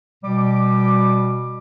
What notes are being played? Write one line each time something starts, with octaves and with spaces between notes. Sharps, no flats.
B2 G3 D6